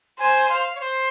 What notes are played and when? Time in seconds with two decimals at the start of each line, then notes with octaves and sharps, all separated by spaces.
0.19 C5 G#5
0.49 F5
0.75 C#5
0.81 C5